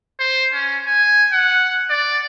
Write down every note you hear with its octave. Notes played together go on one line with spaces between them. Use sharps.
C5
C#4
G#5
F#5
D5